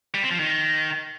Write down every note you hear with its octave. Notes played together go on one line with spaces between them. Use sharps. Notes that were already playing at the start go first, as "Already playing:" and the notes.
G3
C4
F3
D#3